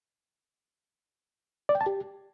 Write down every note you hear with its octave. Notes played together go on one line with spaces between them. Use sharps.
D5
G5
A5
G4